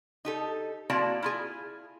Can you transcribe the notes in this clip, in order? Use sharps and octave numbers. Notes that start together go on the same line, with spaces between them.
D#4 G4 A4
A#3 C4 E4 F#4 D5 A5
E4 F4 G#4